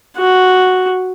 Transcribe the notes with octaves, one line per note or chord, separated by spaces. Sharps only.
F#4